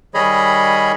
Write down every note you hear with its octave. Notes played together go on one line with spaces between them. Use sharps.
D#3 G3 G#4 C#5 D#5 B5